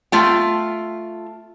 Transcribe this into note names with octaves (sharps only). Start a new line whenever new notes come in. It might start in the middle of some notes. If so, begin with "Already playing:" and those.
A3 F4 G5